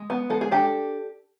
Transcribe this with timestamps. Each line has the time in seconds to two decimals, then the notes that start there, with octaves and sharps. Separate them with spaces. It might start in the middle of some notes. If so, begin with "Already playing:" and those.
Already playing: G#3
0.10 B3
0.30 G#3 A4
0.41 G#4
0.51 D4 G4 A4